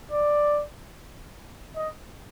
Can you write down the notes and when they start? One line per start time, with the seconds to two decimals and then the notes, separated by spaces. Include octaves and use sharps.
0.11 D5
1.76 D#5